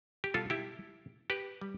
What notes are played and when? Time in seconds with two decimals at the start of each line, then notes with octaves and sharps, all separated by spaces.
0.24 G4
0.34 B2 G3 F4 A4
0.50 E4 G4
1.30 G4 B4
1.61 G3